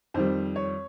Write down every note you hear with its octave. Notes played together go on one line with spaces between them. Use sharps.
F2 D#3 G3 C5
C#5